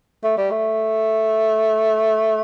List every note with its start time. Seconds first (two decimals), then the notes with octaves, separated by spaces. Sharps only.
0.24 A3
0.37 G3
0.51 A3